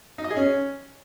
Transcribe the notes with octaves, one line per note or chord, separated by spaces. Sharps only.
D#4
D#5
G#4
C#4